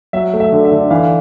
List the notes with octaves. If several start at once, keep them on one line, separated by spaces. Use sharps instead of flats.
F#3 E5
A3
E5
D3
E5
D3
E3 F5